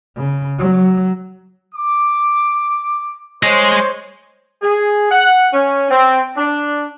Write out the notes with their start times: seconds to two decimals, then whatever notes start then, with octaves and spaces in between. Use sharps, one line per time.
0.17 C#3
0.58 F#3
1.74 D6
3.43 G#3 C5 C#5
4.63 G#4
5.11 F#5
5.54 C#4
5.91 C4
6.37 D4